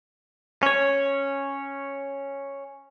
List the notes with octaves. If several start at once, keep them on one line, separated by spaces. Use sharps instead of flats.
C#4 C#5